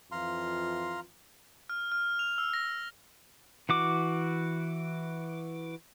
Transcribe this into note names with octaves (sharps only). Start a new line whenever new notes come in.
F2 E3 F4 F5 A#5 C6
F6
F6
F7
E6
A#6
E3 F#4 D6